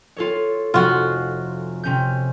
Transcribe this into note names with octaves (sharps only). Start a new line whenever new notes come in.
F4 A4 C#5
F1 F4 F#4 F#5
C3 C#4 G6